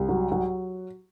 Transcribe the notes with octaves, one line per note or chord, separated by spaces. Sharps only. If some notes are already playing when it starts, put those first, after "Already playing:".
Already playing: C2
F#3
F#3